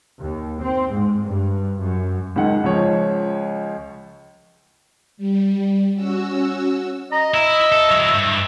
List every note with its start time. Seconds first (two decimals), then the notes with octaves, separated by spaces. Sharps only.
0.20 D#2
0.62 C4
0.92 G#2
1.24 G2
1.81 F#2
2.36 C#2 D#3 F#5
2.64 C#2 F3 C#5
5.17 G3
5.95 C#4 F#4 E6
7.12 D#5 A#5
7.34 E4 E5
7.72 A4
7.91 F#3 E4
8.14 G2